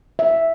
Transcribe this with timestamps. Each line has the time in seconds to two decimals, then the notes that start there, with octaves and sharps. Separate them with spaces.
0.19 E5